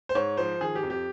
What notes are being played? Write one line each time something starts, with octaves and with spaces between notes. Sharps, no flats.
C5
G#2 C#5
F3 C5
D#3 G#4
G4
F2
G4